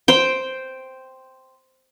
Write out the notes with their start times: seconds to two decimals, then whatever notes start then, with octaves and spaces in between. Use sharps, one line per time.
0.08 C5 G5